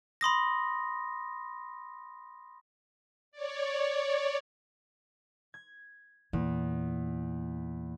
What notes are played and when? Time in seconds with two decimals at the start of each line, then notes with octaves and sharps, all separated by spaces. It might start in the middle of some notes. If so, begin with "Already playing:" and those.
0.21 B5 C6 D#6 A#6
3.31 C#5 D5
5.54 G#6
6.33 E2 A#2